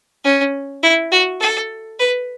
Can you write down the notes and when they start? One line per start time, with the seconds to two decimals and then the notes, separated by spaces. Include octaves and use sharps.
0.24 C#4
0.83 E4
1.11 F#4
1.40 A4
1.99 B4